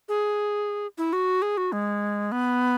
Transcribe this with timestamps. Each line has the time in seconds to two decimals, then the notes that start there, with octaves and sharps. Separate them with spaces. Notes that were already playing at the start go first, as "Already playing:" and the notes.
0.09 G#4
0.98 E4
1.13 F#4
1.42 G#4
1.57 F#4
1.72 G#3
2.32 B3